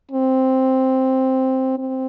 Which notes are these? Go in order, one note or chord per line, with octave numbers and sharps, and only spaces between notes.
C4
C4